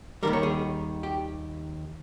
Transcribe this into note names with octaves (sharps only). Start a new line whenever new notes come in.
D#2 D#3 G3 A#4
C#5
G#4
G4